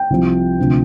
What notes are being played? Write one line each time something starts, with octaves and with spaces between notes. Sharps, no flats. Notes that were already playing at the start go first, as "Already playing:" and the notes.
Already playing: G5
C2 C3 F3
D2 C3 F3